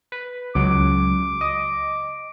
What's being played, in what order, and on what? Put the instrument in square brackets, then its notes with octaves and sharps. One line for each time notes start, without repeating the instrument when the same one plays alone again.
[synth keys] B4
[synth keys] C#2 F#3 [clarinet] D6
[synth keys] D#5